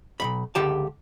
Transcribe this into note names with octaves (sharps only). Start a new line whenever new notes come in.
B1 E2 B5
C#2 D3 G4 A5